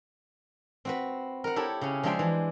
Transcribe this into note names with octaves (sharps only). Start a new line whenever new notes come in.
C4 F#4 B4
A#4 F#5
E4 G4 A4 C#5
C#3 C#4
F3 G#3 D4 E5 G5 C6
E3